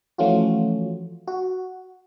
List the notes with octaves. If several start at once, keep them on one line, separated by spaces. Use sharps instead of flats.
E3 F3 A3 C#4 F4 F#4
F#4